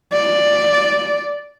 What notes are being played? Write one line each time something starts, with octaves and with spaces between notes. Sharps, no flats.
D5